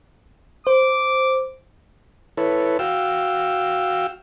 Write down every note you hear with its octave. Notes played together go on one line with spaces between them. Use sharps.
C5 D6
E4 A4 B4 C#5
F#4 F5 G5 E6